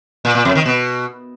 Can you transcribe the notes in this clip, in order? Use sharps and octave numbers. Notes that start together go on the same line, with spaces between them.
A#2
A#2
F2
D#3
B2